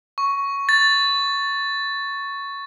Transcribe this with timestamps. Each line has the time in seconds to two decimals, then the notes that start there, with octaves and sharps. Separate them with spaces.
0.18 C#6
0.69 A6